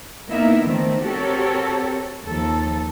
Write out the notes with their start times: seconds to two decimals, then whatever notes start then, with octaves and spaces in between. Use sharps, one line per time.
0.29 A#3 B3 D#4 E4 A#4 E5
0.62 D3 D#3 A3 C4
1.04 C4 F#4 G4 A4 A#4 C#5
2.25 D#2 F3 A4